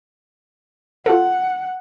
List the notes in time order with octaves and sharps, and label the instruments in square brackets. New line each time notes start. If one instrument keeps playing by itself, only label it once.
[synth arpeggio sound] F4 A4 [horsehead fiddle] F#5